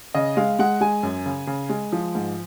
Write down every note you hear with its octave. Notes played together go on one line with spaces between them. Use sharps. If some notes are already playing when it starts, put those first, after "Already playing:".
C#3 D#5
G#3 F5
G#3 F#5
G#3 G#5
F#2
C#3
C#3
G#3
F3
G#2